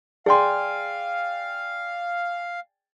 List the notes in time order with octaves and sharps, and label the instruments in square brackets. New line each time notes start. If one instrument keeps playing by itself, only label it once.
[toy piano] G#4 C6 [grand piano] D5 G5 G#5 [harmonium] F5